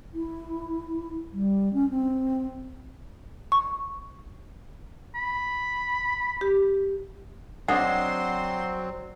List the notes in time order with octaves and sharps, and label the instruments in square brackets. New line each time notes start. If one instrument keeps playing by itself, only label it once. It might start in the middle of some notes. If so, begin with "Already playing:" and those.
[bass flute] E4
G3
C#4
C4
[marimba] C#6
[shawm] B5
[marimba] G4
[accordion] F#3 C4 [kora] D4 G#4 D#5 [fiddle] C5 C6 [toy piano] F#5